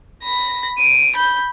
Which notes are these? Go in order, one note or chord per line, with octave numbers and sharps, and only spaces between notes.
B5 A#6
D7 D#7
B5 G6